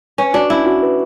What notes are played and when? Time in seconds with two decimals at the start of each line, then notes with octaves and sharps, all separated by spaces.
0.18 C#4 B4
0.33 D4 F#4
0.50 C#4 E4
0.66 F#4
0.82 B4